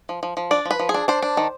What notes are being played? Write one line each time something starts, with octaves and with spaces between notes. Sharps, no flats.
F3
F3
F3
D4 D5
F3
B4
F3
G#4
D4
D4 C5
D4
D#3